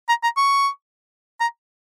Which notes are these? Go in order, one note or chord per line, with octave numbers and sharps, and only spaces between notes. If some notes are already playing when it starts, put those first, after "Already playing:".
A#5
A#5
C#6
A#5